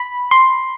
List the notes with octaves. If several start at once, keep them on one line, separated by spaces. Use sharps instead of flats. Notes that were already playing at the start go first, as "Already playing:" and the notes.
Already playing: B5
C6